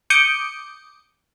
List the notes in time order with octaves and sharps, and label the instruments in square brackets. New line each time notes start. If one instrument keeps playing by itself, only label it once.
[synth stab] D6 D#6 G6 C#7